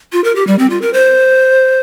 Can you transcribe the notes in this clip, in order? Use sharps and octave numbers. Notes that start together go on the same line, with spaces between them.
F4
A#4
G4
G3
C4
F4
A#4
C5